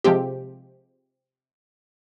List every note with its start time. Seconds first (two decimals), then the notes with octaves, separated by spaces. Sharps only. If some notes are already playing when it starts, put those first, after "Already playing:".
0.04 C3 F3 G#3 C4 G4